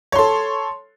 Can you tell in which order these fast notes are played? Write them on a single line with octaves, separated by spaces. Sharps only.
C#5 C6 A4